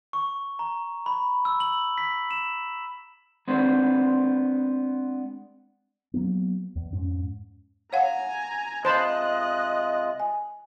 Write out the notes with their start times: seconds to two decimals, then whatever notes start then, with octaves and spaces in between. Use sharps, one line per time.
0.13 C#6
0.59 A#5
1.06 B5
1.45 E6
1.60 F#7
1.98 B6
2.31 E7
3.48 G#3 B3 C4 D4
6.14 F#3 G3 A#3 B3
6.75 E2
6.93 F2 G#2 C#4
7.93 C#5 F5 F#5 G#5 A#5
8.85 C3 G#3 F4 C5 D#5 A5 B5 F#6
10.20 G#5